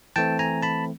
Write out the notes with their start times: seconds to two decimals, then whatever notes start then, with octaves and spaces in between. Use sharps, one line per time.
0.16 E3 A3 C4 G5 A5
0.39 G#5 A#5
0.63 A5 B5